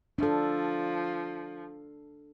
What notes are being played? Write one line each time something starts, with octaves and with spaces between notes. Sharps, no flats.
F3 D4 A4